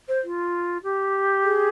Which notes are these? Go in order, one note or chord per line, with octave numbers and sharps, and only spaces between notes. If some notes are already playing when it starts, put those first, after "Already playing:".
C5
F4
G4
G#4